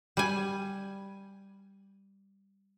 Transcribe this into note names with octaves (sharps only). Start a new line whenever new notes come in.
G3 G#5